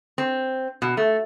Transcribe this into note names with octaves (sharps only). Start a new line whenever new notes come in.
C4
B2
A3